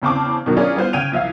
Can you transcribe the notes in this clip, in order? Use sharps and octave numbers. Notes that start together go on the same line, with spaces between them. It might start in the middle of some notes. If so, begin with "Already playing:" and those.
E2 C#3 C4 A5 D6
E2 B2 D#3 F#3
C#4 D4 F4 G#4 A#4 D5
G3 B3 F4 C5
C#3 G5 G#6 D#7 F7
C2 F3 E5 F5